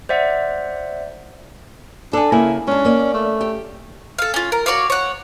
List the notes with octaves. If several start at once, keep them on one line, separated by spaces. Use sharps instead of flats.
C5 D5 E5 F#5
D4 A4 G#5
C#3 A#3 E4 G#5
G#3 C#4 D4
A#3 D5
A3
G4
A4 F5
C#4 F4
A#4
F#4 C#5 D5 F5
C#5 F#5